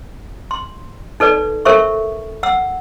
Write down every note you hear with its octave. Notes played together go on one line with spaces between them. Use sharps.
C6
D#4 A4 B4 D5
A4 A#4 C5 E5 C#6
F#5 E6